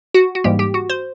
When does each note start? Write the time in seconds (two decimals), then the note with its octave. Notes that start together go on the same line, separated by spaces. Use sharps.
0.14 F#4
0.35 F#4
0.44 G#2 E3 G3 A#3 G4
0.59 G4
0.74 F#4
0.90 C5